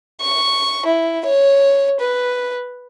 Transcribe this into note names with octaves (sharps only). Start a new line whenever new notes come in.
C#6
E4
C#5
B4